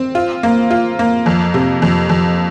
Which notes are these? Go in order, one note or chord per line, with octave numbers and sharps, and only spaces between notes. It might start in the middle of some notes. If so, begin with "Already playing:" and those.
Already playing: C4
F4
A#3
F4
A#3
F2
C3
F2
F2